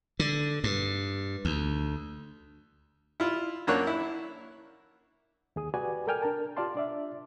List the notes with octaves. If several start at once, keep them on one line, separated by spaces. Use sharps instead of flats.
D3
G2
D2
E4 F4
F#2 A#3 D4 C#5 F#6
E4
D#2 G#4 D#6
F#4 G4 B4 D5 G#5
A4 A#4 D5 G5 G#5 F6
D4 A#4 A5
F4 G4 D5 F5 A5 C6
D4 D5 E5